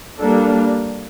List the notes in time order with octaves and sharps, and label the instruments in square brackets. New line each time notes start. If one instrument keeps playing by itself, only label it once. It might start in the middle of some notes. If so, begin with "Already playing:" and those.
[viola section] G3 A#3 D4 A4